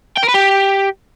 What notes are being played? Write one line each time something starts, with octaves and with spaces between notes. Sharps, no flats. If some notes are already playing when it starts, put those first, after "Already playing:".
G5
A#4
B4
G4